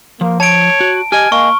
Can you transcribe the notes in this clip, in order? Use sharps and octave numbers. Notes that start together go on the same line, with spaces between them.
F3 A#3
C#5 A5 D7
F#4
G4 D#5 G#5 F6
A#3 D#5 G#5 C#6